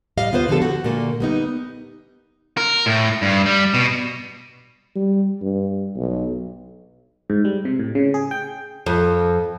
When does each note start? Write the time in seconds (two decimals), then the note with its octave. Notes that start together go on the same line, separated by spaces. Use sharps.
0.17 A2 G3 D#5 F5
0.32 D#2 B3 F4 B4 C5 F5
0.49 D3 F3 G3 G4 A4
0.62 F#4
0.84 A#2 D3 A3 A#3
1.20 G3 B3 D#4
2.57 A#4
2.86 A2
3.22 G2
3.46 G3
3.74 B2
4.95 G3
5.42 G2
5.96 B1
7.30 G#2
7.45 G3
7.65 C3
7.79 A2
7.95 C#3
8.14 G#4
8.31 G5
8.86 F2